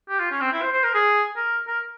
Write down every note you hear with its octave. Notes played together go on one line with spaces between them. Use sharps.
G4
F4
C#4
C4
E4
C5
C5
A#4
G#4
A#4
A#4